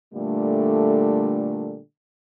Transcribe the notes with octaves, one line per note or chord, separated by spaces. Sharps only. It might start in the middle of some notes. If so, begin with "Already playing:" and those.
A#2 D3 G3 A3